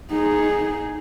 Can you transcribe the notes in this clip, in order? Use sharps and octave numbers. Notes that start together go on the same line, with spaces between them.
D#4 G#4